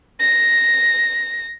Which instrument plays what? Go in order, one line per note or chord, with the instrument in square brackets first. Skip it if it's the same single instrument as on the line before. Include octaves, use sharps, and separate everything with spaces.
[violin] A#6